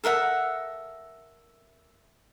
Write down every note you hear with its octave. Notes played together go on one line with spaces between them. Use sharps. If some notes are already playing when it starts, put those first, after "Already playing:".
A4 A#4 E5 F#5